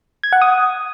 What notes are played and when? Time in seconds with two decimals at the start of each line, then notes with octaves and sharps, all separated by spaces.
0.23 G#6
0.33 F#5
0.42 D#6